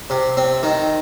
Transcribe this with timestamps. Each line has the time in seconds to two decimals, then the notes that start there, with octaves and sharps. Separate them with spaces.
0.10 C3
0.37 C4
0.63 D#3